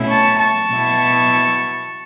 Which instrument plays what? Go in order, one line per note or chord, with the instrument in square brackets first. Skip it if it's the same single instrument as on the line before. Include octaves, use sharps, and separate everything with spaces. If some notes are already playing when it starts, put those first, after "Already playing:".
Already playing: [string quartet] B2 A3 C#4 E4
A5 C#6
A5 C#6
B2 B3 E4